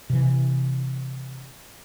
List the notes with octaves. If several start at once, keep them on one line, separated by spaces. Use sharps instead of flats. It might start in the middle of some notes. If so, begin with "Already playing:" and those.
C3 E3